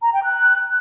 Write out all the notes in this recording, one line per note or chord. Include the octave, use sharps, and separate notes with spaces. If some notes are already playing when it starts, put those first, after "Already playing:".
A#5
G5
F#6